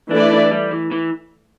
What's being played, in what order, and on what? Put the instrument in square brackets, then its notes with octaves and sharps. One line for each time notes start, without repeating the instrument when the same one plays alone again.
[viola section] E3 A3 E4 B4 D5 [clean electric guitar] D4
[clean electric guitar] D4
G3
E3
E3